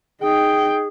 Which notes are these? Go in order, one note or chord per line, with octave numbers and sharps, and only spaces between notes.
D#4 G#4 G5